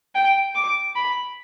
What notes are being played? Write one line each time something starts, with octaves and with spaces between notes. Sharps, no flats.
G5
D6
B5